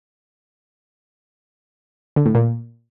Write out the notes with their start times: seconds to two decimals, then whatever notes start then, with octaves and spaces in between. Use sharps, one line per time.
2.16 D3
2.26 A2
2.35 A#2